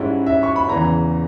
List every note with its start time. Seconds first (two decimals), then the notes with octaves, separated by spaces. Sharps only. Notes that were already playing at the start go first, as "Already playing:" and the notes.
Already playing: G#2 G3 C#4 E4
0.26 E5
0.43 C#6
0.56 B5
0.69 E2 C#3 E3 A#5